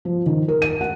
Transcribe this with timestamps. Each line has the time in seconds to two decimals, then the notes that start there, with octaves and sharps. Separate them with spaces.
0.05 F3
0.26 D#3
0.48 A#4
0.62 D#7
0.81 F#5